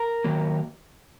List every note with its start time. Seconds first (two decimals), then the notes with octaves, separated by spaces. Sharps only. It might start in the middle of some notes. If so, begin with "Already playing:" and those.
Already playing: A#4
0.24 D#3 F#3 A#3